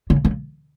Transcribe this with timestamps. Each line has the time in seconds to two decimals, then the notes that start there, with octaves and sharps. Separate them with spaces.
0.10 C#3
0.25 C#3